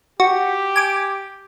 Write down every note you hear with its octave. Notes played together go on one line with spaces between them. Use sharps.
F#4 G4
G#5 D6